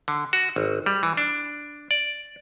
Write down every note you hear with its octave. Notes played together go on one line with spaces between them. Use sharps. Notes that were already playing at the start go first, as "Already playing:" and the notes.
D3
F#4
G#1
G3
E3
D4
D5